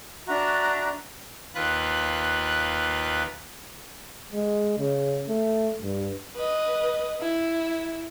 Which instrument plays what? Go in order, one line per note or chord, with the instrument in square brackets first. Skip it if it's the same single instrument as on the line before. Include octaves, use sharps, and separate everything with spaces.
[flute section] D4 F#4 E5 A#5
[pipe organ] D#2 F4 B4 F#6
[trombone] G#3
C#3
A3
G2
[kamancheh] B4 D#5
E4